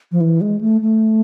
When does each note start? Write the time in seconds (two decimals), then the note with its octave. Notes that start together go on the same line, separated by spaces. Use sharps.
0.12 F3
0.21 E3
0.41 G#3
0.61 A3
0.81 A3